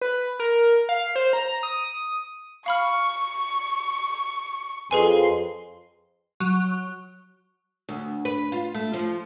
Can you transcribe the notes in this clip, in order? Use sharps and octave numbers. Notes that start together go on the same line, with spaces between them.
B4
A#4
F5
C5
A#5
D#6
F5 B5 C#6 F6
F2 G#4 B4 G#5 C6
F#3
D2
B4
F4
A3
F3